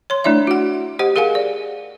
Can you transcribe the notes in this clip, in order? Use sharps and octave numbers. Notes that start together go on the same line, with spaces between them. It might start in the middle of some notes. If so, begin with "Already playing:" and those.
C#5 C6
A3 D4 E4 D5 E5
F#4 F#5
G4 C5 D#5 F#5
G#4 A#4 F5 F#5 G#5
D5